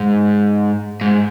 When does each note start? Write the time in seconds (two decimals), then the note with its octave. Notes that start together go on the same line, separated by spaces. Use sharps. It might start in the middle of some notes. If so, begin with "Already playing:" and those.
Already playing: G#2
1.01 G#2